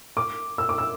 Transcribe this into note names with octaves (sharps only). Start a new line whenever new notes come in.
D6
E6
D6
E6